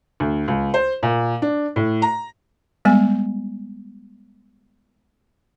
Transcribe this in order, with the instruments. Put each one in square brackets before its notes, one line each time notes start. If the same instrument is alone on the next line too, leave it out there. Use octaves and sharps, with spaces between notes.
[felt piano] D2
C#2
C5
A#2
D4
A2
A#5
[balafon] G3 G#3 B3 G#5